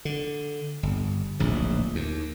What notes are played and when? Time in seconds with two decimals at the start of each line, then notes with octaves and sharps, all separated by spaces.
0.05 D3
0.83 G1
1.40 D1 A#1 G#2
1.95 D#2